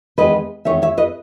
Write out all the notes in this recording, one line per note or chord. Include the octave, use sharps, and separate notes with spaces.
E2 D#3 G#3 B4 D#5
E2 D#3 G#3 C#5 E5
C#5 E5
B4 D#5